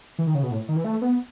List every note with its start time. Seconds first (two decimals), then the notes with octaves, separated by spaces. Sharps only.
0.19 E3
0.27 D#3
0.35 C#3
0.43 B2
0.51 A2
0.69 D#3
0.76 E3
0.84 A3
1.02 B3